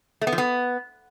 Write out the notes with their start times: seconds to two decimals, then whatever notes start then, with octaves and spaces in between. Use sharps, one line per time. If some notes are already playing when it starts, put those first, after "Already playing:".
0.21 A3
0.27 B3
0.32 F3
0.38 B3